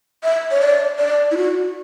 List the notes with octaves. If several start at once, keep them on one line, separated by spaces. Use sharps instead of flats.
E5
C#5
D5
D5
E4
F#4